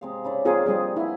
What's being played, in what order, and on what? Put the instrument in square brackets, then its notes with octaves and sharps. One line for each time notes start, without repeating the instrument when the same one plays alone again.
[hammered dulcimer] C3 G#3 F5
C#3 E4 D5
[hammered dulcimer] F3 A#3 D5 [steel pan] C4 F4 G#4
[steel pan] G3 C4 G#4 [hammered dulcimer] F4 D#5
[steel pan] E4 [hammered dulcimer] F#5 G#5